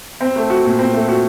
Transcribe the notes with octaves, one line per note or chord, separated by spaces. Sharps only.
C4
A3
F#4
A#2
C4
A3
F#4